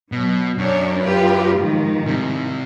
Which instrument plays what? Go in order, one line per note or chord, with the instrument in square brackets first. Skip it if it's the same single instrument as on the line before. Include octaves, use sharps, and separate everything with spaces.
[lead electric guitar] B2 [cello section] F#3
[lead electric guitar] F#2 [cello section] D4 C#5
[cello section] F4 G4 B4
G#2 D#3 F3
[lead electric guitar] C3 G3